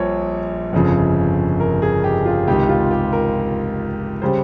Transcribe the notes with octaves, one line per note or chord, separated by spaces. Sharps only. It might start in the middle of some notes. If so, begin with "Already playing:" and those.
Already playing: A#1 A#2 G3 C5 C#5
G1 F2 C#3 F3
A#4
G#4
G4
F4
C#2 C3 D#3 G4
F4
G4
A#4
C#3 G3 C5